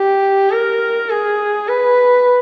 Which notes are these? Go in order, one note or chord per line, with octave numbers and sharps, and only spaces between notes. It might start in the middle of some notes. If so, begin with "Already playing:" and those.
Already playing: G4
A#4
G#4
B4